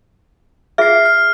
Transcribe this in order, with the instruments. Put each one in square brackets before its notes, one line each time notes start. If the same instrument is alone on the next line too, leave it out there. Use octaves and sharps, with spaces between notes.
[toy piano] F4 G#4 E5 [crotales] F6 C7
[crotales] F6